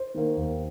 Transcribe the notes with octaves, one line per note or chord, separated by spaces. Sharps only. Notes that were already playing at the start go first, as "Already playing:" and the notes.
Already playing: C5
D#3 A#3
D#2